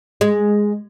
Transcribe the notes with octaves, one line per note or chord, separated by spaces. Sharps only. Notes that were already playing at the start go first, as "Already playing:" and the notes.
G#3